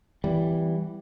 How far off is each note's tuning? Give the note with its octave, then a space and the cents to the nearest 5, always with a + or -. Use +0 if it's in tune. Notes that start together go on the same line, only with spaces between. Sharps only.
E3 +0 G3 +0 B3 +40